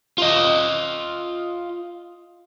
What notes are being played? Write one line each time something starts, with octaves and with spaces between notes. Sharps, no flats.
F4 D#5